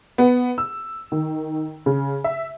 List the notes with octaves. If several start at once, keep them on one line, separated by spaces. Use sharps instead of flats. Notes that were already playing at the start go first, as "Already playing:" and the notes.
B3
E6
D#3
C#3
E5